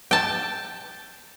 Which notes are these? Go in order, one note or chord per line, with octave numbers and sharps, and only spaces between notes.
G5 A5